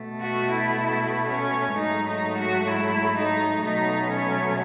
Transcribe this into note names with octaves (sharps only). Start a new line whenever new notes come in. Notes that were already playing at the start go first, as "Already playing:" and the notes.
Already playing: B2 A3
F#4
E4
E4
C#4
G#2 F#3 A3 D#4
D#4
F#4
E4
D#4
B2 F#3 A3 D#4
C#4